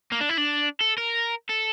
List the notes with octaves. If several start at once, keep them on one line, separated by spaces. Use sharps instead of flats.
A#3
D4
E4
D4
A4
A#4
A4